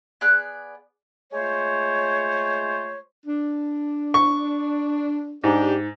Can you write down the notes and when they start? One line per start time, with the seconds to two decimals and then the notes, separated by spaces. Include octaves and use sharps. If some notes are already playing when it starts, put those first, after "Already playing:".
0.21 B3 G#4 D5 F#6
1.33 G#3 A3 F4 C5 C#5
3.26 D4
4.14 C#6
5.44 G#2 D4 G4